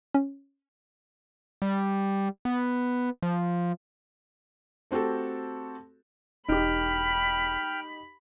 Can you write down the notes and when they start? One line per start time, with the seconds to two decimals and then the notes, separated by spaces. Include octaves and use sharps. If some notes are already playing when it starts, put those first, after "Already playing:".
0.14 C#4
1.62 G3
2.45 B3
3.22 F3
4.91 A3 C4 F#4 G4 A4
6.48 E1 D#4 G4 G5 B5 F6